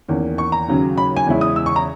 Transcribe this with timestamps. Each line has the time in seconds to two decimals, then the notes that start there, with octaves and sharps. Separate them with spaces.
0.08 E2 D#3 A#3 C#4
0.38 C#6
0.52 A#5
0.68 D#2 C#3 F#3 C#4
0.98 B5
1.17 G#5
1.27 E2 C#3 G#3 C#4 E4
1.41 D#6
1.56 E6
1.66 C#6
1.76 A#5